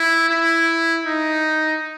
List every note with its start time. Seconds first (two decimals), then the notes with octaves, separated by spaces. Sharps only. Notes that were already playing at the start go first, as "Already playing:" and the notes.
Already playing: E4
0.29 E4
1.05 D#4